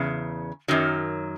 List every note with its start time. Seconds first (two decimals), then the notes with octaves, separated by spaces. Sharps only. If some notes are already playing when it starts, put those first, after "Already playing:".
Already playing: E2 C#3
0.68 F#2 D#3 F#3